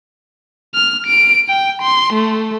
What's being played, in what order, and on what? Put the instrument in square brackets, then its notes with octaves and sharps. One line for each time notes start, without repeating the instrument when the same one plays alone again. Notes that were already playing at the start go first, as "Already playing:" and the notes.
[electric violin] F6
D7
G5
C6
A3